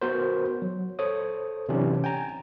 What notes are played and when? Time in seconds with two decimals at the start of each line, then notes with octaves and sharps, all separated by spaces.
0.02 B3 F#4 A#4 C5
0.62 F#3
0.99 A4 C5 C#5 D#6
1.69 C3 E3 F#3 C#4 D4 G4
2.04 G5 G#5 A#5